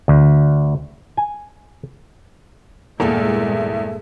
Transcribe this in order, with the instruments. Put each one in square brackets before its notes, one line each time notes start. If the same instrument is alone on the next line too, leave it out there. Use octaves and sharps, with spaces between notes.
[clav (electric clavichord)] D2
G#5
[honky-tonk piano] E2 [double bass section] G2 A#2 G#3 [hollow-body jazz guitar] A#3 A4 A#4 [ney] E5